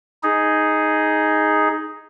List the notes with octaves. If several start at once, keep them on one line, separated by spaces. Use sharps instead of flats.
D#4 G#4